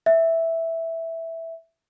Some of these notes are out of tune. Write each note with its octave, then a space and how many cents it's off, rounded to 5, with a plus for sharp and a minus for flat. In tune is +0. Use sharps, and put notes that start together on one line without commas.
E5 -5